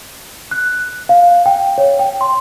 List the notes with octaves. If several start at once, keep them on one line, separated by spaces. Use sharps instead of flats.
F#6
F5
G5
C#5
G5
C6